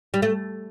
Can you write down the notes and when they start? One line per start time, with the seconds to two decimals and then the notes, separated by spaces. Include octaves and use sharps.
0.14 G3
0.22 A3